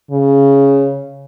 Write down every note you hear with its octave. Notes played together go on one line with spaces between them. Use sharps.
C#3